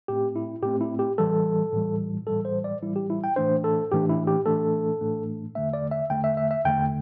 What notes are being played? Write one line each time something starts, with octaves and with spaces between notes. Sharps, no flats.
A2 A3 C4 G4
E4
A2 A3 C4 G4
E4
G4
A2 E3 G3 A4
A2 E3 G3
A2 E3 G3 A4
C5
D5
A2 E3 G3 E4
G4
E4
G5
A2 E3 A3 D4 C5
A4
A2 E3 A3 D4 G4
E4
G4
A2 E3 A3 D4 A4
A2 E3 A3 D4
E2 D3 A3 E5
D5
E5
E2 D3 A3 G5
E5
E5
E5
E2 D3 A3 G5